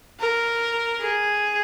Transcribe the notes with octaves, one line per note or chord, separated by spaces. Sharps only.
A#4
G#4